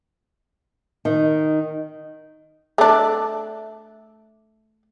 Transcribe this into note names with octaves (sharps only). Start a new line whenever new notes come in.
D#3
A3 D4